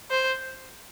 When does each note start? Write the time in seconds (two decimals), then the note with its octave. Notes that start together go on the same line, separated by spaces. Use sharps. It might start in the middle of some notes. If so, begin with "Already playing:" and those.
0.11 C5